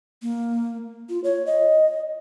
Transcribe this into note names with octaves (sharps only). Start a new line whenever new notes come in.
A#3
F4
C#5
D#5